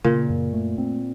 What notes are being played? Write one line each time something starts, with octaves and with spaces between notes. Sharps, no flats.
A#2 C#3
F#2
A3
C4